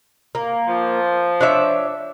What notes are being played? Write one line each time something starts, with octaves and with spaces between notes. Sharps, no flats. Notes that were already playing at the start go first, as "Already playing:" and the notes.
A#3
F3
D4 C#5 E5